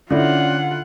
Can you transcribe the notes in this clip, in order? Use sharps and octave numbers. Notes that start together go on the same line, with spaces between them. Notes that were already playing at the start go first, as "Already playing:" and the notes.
D3 C#4 E4 F4 D5 F#5